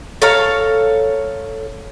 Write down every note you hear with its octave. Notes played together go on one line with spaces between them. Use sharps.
A4 C#5 F5 A#5